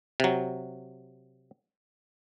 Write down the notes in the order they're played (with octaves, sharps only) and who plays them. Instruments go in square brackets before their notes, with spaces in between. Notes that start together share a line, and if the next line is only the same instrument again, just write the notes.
[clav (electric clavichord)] C3 F#3